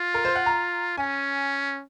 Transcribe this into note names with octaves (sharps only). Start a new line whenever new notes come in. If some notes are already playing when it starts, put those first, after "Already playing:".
Already playing: F4
A#4
C5
F#5
A#5
C#4 G#5